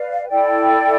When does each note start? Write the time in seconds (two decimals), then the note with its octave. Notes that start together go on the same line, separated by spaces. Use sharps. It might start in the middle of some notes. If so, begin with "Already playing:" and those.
Already playing: B4 D5 F5
0.28 E4 A4 D5 G5